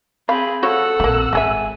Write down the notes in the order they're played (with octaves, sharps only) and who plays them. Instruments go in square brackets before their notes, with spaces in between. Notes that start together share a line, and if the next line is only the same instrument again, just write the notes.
[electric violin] C4 G#4 [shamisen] F5 [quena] B5
[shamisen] F3 F#4 C#5 [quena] A4 [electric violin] F#5 E6
[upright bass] A#1 C4 [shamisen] A3 A#3
[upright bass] G#1 [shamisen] G#3 G#4 E5 [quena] G#5